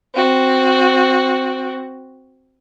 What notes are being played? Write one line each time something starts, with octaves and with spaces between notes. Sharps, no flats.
C4 F#4